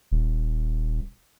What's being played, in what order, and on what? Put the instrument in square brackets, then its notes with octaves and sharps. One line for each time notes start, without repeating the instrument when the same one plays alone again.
[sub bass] D#1